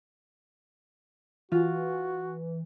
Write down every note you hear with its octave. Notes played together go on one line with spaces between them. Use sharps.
E3 F4 F#4